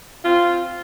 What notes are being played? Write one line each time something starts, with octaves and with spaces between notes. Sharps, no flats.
C4 F4